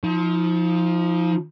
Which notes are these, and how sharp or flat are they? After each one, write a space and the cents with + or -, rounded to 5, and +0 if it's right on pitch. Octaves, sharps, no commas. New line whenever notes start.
F3 +0 D#4 +40